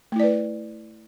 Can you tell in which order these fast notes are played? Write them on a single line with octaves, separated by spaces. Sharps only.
A3 E4 D5 B4